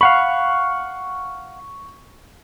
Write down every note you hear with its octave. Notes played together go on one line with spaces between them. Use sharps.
F5 F#5 B5 C#6